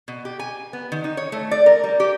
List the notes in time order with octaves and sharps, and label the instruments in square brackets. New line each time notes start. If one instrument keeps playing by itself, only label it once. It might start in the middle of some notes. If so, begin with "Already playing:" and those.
[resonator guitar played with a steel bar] B2
G4
G#5
B3
D#3
D#4
C#5
A3
D5
A#4
G3
G4